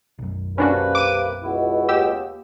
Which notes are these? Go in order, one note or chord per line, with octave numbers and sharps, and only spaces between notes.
B1 F#2
C3 A#3 C#4 D4 F#4 B4
D6 D7 D#7
C#2 B2 E4 F#4
D#2 G4 E6